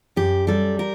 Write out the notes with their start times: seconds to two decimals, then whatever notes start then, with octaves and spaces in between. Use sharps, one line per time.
0.16 F#2 G4
0.47 G3 A4
0.79 A#4